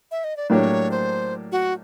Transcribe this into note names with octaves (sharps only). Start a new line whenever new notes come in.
E5
D#5
D5
A2 F#3 A#3 D4 G4 C#5 D5
C5
F#4